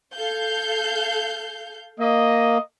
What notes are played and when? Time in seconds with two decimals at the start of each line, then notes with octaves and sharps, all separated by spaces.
0.14 A4 F5 G6
1.99 A#3 D#5